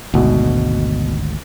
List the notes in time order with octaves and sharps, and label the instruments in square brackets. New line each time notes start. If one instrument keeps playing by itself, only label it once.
[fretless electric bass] G#1 D2 [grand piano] G#2 B2